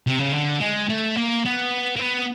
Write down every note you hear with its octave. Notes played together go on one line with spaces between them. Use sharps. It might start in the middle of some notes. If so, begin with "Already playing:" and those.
C3
C#3
D3
G#3
A3
A#3
B3
A#3
B3